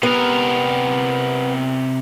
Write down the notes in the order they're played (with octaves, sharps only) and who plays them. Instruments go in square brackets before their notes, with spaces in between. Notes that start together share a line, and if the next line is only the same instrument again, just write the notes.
[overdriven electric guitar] C3 A#4 [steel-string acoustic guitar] B3